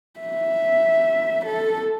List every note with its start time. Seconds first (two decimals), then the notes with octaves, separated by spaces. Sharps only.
0.20 E5
1.46 A4